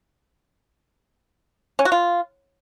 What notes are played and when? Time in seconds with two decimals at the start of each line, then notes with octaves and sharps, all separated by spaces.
1.79 C#4
1.85 F#4
1.92 F4